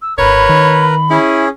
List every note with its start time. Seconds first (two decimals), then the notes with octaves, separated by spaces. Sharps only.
0.02 E6
0.18 D1 G#1 A#4 B4 C#5 B5
0.49 D#3
1.10 C#4 E4 G#4